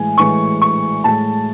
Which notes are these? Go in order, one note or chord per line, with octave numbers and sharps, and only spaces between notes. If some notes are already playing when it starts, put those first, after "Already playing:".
Already playing: A2 E3 G#3 G#5
A2 E3 G#3 C#6
C#6
A2 G#3 A5